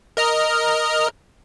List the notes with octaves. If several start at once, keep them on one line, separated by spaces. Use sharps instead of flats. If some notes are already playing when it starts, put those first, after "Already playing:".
A#4 D#5 F6